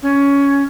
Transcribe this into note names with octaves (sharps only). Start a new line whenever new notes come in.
C#4